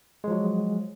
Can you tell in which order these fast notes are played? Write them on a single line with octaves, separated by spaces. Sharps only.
G#3 F3 F#3